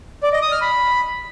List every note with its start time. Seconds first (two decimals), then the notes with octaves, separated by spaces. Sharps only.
0.23 D5
0.33 D#5
0.42 D#6
0.52 F6
0.61 B5